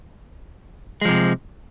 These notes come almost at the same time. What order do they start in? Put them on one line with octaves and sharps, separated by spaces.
G#3 F3 C3